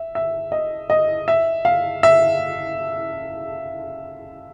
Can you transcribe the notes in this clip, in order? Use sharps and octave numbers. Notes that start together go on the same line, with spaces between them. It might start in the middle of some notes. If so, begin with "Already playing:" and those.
Already playing: E5
E5
D#5
D#5
E5
F5
E5